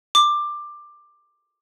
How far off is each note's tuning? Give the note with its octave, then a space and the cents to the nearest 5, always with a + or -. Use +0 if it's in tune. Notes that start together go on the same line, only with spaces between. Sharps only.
D6 +15